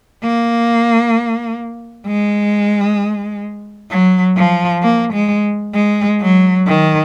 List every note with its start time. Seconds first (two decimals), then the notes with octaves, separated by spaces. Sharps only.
0.23 A#3
2.07 G#3
3.90 F#3
4.37 F3
4.83 A#3
5.13 G#3
5.74 G#3
6.21 F#3
6.67 D#3